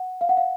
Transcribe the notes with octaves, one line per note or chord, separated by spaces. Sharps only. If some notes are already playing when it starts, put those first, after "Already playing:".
Already playing: F#5
F5
F#5
F5